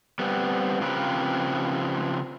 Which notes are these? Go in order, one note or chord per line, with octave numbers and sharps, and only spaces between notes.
G3 B3 C4
C#3 F3 C4 G4 A#4 B4